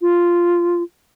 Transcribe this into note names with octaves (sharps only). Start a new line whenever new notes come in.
F4